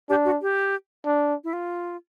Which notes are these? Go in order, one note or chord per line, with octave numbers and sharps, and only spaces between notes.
D4 G4
F#4
G4
D4
E4
F4